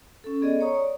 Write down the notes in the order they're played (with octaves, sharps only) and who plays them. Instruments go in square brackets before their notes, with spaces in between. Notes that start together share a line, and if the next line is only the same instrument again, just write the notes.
[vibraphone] C#4 A4
B3 G#4 A4 D5 D#5
C#5 A#5 C#6 D#6
D5